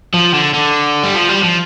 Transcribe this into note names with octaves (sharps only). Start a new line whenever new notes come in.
F3
D3
D3
G3
F3
G3
F3